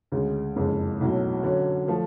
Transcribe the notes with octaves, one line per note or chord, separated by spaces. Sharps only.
D2 C#3 G#3
F#1 F2 C#3 G#3
B1 A2 F#3
D3 F#3 C#4
F3 A3 F4